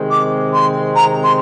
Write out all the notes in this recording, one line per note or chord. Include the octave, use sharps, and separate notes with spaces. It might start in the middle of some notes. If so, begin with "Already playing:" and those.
Already playing: C3 D#3 G#3 C4
D6
C6
A#5
C6